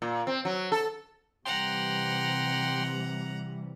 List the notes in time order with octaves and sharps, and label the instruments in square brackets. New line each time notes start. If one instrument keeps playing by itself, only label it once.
[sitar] A#2
C4
F#3
A4
[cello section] C3 E3 G3 [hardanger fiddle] F#5 A#5 [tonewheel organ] G5 C6